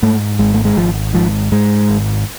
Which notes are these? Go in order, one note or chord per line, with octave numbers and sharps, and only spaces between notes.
G#2 A3
G#1 G#3
A3
G#3
G#1 F3
G#2 F3
G#2 G#3
G#1